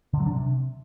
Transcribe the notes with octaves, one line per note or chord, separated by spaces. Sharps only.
D3
F#3
D4
C3